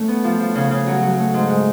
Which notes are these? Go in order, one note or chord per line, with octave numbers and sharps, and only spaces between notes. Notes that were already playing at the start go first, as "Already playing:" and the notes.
Already playing: A3 C#4
B3
F3
F3
C#3
C#3
F#3
F#3
A3
G#2
G#3